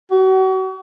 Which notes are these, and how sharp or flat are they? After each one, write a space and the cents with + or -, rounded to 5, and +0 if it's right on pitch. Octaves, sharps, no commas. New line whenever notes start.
F#4 +40